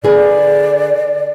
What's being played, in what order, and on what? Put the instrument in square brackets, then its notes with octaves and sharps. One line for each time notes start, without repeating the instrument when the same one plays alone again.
[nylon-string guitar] D3 G#4 B4 [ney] D5